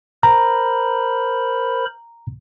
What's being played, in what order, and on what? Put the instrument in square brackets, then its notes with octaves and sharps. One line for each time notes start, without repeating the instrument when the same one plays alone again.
[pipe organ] A#4 C5 B5 [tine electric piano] A#5